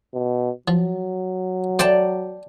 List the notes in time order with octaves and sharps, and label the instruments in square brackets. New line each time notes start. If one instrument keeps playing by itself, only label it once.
[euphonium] B2
[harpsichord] F3 [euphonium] F#3
[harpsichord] C5 [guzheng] D5 G5 A5